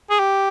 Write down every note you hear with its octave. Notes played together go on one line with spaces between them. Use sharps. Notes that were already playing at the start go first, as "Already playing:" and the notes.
G#4
G4